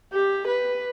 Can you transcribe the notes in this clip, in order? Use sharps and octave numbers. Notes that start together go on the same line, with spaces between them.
G4
B4